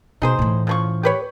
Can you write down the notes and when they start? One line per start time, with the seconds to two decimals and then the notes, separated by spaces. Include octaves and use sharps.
0.22 B2 D#4 G#4 C5
0.39 A2 E3
0.67 C#3 F3 C#6
1.03 G4 B4 C#5